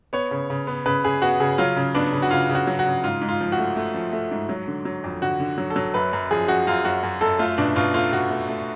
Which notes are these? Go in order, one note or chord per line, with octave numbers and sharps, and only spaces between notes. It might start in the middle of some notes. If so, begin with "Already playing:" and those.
B3 C#5
C#3
C#3
B3
C#3 B4
C#3 G#4
B3 F#4
C#3 G#4
F#3 F4
C#3
B3 D4
C#3
F#4
C#3 F4
C#3
F#4
F#3
F#4
C#3
G#2 F4
G#2
F4
F3
F#4
A3
A3
F3
A3
G#2
F#3
D3
F#3
F2
D3 F#4
D3
F#3
A4
F#3
F#2 B4
F#2
F3 G#4
F3 F#4
F#2 F4
F#2 F#4
F#2
F#2 A4
A3 F4
B2 D4
B2 F4
A3 F4
B2 F#4
A3
A3